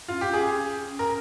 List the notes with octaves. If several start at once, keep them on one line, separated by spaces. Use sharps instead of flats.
C#4 F4
G4
C#4 G#4
A#4